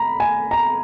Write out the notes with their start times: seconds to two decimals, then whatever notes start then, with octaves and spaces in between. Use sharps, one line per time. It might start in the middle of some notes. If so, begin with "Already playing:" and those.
Already playing: A#5 B5
0.20 G#5
0.51 A#5